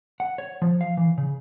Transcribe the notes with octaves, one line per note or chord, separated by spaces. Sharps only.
F#5
C#5
F3
F5
E3
C#3